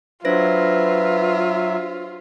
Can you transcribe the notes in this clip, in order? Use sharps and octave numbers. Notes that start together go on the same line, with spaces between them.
F#3 D4 F4 B4 C5 E5 A#6